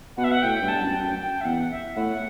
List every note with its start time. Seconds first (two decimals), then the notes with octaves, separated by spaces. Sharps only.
0.17 B2 F#5
0.24 E5
0.31 F#5
0.42 A2 G5
0.62 G2
0.68 A5
0.81 F#2
0.94 G5
1.00 F#2
1.19 G5
1.41 E5
1.45 E2 F#5
1.71 E5
1.96 A2 F#5